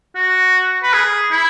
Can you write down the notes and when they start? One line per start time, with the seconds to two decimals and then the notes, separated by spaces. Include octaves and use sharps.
0.15 F#4
0.83 B4
0.93 G#4
1.31 E4